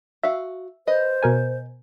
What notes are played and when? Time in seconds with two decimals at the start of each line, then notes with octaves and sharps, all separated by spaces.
0.23 F#4 E5 F5
0.87 B4 C5 D#5
1.22 B2 A#4 G#5